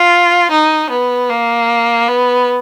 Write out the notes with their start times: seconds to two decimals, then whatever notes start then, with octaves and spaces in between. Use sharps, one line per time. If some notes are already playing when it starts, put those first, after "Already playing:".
Already playing: F4
0.51 D#4
0.90 B3
1.30 A#3
2.08 B3